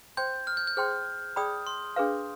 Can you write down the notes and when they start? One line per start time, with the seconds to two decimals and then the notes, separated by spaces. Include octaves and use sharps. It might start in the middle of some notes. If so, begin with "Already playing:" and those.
0.17 C5 G5 C6 G6
0.47 F6
0.57 G6
0.67 G6
0.77 G#4 C5 G5 C6 F6
1.36 G#4 D5 G5 B5 D#6
1.67 C6
1.96 D4 G#4 B4 F5